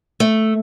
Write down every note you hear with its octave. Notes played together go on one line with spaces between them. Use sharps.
A3